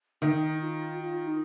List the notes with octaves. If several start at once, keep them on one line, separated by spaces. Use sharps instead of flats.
D#3 D#4
F4
F4
D#4